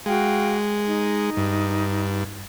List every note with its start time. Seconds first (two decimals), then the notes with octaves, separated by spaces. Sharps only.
0.06 G#3 F#4 F5 G5
0.85 D#4
1.37 G2